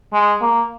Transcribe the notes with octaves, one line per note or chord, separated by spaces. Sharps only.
G#3
A#3